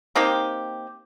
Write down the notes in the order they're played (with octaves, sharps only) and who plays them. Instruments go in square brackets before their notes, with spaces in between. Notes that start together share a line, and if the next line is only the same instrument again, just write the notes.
[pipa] A#3 C4 D#4 G4